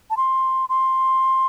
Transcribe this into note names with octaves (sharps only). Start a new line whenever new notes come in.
A5
C6
C6